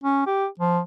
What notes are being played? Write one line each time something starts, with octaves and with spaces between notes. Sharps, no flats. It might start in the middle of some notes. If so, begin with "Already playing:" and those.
C#4
G4
F3